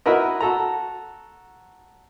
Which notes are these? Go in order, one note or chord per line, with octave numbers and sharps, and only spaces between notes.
E4 F#4 A#4 B4 D#5
F#4 A4 A#5